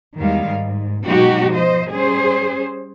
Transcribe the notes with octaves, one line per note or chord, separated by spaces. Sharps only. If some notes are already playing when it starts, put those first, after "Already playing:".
E2 D#3 G3 G#3 F5
G#2
B2 F#3 G#3 D#4 F#4 G4
F3 C5 D#5
G3 C#4 G#4 C5